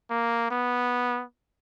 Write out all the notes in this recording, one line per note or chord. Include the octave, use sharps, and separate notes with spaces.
A#3
B3